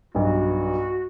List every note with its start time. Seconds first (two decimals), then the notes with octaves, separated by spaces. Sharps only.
0.15 B1 G2 F#4